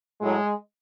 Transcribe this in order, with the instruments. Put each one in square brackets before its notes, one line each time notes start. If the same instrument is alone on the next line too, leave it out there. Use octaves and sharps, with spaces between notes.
[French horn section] A2 F#3 G#3